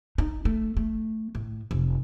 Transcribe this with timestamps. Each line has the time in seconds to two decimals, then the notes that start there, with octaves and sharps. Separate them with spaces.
0.18 D#4
0.45 A3
0.77 A3
1.35 A2
1.71 F1